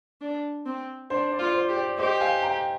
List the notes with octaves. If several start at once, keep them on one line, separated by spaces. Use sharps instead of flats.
D4
C4
D4 C5
D5
F4
C5
G4
D5
G4 C5 D#5
F5 G#5
G5 A#5